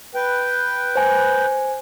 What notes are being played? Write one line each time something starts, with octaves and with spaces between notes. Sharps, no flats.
B4 G5
C5 G#5